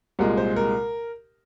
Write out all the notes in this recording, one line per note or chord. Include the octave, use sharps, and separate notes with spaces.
C2 A#2 G#3 A#4
C5
A#4